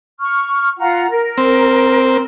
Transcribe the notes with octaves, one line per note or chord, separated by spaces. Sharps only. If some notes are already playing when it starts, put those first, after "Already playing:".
C#6 F6
F4 F#5 A#5
A#4
C4